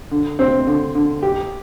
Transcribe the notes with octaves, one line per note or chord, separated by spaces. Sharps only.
D3
C4
D3
D3
G4